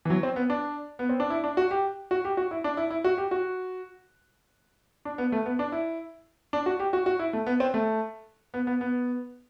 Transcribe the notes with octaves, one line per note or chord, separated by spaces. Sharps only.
E3
F#3
C4
B3
D4
B3
C4
D4
E4
D4
F#4
G4
F#4
G4
F#4
E4
D4
E4
E4
F#4
G4
F#4
D4
B3
A3
B3
D4
E4
D4
F#4
G4
F#4
F#4
E4
A3
B3
C4
A3
B3
B3
B3